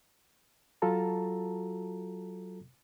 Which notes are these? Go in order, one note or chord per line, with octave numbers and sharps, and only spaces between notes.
F#3 F4 F#4 A4 A5 A#5